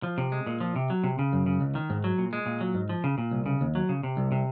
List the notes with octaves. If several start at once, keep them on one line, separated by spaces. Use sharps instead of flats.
F3
C3
G#3
A#2
F3
C3
F#3
C3
C#3
F#2
C#3
C#2
D#3
G#2
F#3
A#2
G#3
A#2
F#3
G#2
F3
C#3
A#2
C2
C#3
D#2
F#3
C#3
C3
C2
C3